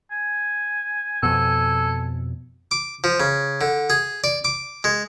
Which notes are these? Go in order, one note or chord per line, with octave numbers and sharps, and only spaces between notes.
G#5
F2 B2 A4
D6
F3
C#3
D3
G#4
D5
D6
G#3